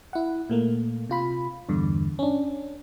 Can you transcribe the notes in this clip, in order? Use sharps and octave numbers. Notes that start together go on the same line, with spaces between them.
E4 F#5
A#2 A3 A#3
C3 F4 B5
E2 G2 D3
C#4 D4